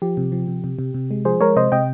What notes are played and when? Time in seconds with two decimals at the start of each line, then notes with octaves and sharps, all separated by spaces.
0.02 F3 G4
0.17 C3
0.32 F3
0.48 C3
0.64 C3
0.79 C3
0.94 C3
1.11 G#3
1.25 F3 G#4 C5
1.41 G#3 A#4 C#5
1.56 C3 C5 D#5
1.72 C3 D#5 G5